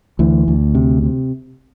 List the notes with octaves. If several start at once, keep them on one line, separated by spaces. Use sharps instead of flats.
D2 E3
D2
C3
C3